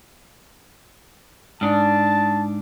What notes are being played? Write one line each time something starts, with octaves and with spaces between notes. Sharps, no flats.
G#2 D4 A5